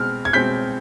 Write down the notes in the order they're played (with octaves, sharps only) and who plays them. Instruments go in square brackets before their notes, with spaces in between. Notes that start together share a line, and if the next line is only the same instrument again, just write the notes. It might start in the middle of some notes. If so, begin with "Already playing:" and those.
Already playing: [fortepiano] B2 G#3 C4 [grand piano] F6
[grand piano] G#6
[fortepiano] B2 G#3 C4 [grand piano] G6 B6